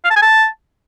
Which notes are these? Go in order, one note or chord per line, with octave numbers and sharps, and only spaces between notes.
F5
A5
G#5
A5